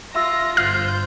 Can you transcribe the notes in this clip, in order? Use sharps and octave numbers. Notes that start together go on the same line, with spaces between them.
F4 E5 C6 E6 A#6
G1 F4 C5 F6 G6 C7